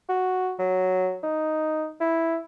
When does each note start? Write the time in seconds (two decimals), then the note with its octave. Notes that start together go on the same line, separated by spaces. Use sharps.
0.09 F#4
0.59 F#3
1.23 D#4
2.01 E4